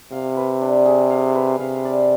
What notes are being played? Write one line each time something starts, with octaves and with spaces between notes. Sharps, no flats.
C3 F5
B4
D4
G#4
F5
B4
C3 F5
D5